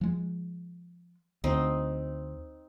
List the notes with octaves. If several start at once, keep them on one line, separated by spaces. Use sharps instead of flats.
F3 G#3
D2 C4 D#4